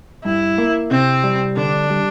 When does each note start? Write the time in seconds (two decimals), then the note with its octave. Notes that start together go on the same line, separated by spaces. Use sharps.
0.25 G2 E4
0.58 A#3
0.91 C3 C4
1.24 G3
1.57 D3 D4
1.90 G3